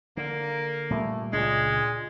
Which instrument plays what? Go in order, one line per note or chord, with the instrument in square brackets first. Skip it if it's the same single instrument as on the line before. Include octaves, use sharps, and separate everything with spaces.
[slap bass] D3 [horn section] A#3
[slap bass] A#2 G3 [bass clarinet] A3
[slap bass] C#2 D4 [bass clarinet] A#2 [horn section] G#3